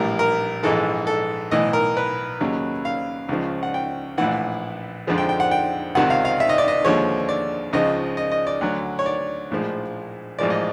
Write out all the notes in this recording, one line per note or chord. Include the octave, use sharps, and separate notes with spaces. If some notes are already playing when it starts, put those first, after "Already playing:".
Already playing: A#1 A2 E3 G3 A#4
A#4
A#1 G#2 E3 G#3 A4
A4
B1 A2 E3 D#5
A#4
B4
D#2 C#3 F#3
F5
C#2 C#3 F3
F#5
G5
A#1 A2 E3 F#5
F2 D3 F3 G#3
G5
G5
F#5
G5
C#2 C3 D#3 F#5
F5
F5
E5
D#5
D5
D#5
D#2 D3 F3 G#3 C#5
D5
C#2 C#3 F3 G#3 D#5
D#5
D#5
D5
D2 D3 F#3
C#5
D5
A#1 A2 F3 G#3
A1 G#2 F3 G#3 D5
D#5